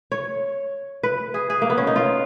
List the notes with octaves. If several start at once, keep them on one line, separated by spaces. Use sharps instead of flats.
C#5
B4
G#4
G#4
A#3
B3
C#4
D#4
F4